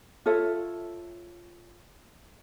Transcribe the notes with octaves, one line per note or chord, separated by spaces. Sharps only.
F4 A4 C#5 E5